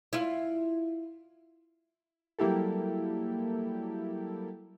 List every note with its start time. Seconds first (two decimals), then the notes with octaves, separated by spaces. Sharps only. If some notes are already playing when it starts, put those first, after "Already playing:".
0.13 E4 F4
2.39 F#3 G3 A#3 E4 G4 A4